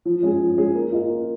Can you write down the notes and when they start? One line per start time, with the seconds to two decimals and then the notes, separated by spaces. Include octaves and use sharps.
0.05 F3
0.23 G#3 C#4 G#4
0.40 F3
0.57 G#3 C#4 G#4
0.75 A#3
0.92 F4 G#4 D#5
1.09 A#3